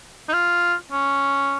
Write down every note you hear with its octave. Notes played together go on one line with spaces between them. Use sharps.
D#4
F4
C#4